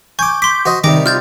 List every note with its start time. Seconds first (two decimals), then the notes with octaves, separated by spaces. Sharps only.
0.19 G#5 C#6 D6 G6
0.42 C6 D6 B6
0.66 F#4 C5 D#5
0.84 C3 D#3 G3 D#4 G5 D6 A#6
1.06 F4 F6 G6 A6